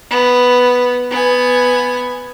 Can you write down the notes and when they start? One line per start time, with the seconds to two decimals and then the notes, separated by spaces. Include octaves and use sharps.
0.11 B3
1.11 B3 G#5